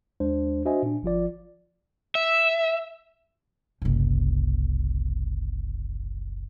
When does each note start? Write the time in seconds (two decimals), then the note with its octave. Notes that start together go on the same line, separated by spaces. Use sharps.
0.20 D#2 G#3 D4 C5
0.65 D4 F#4 C5 D#5 E5 G#5
0.83 A#2 D4
1.03 G1 F3 F4 D5
2.15 E5
3.82 F#1 C2